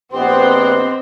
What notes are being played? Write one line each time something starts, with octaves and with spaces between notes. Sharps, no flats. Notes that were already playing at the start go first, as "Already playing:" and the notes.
A#1 B3 C4 G4 D#5 C6